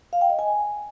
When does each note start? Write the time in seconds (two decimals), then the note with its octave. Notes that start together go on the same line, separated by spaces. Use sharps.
0.13 F5
0.21 G5
0.30 D#5
0.39 G#5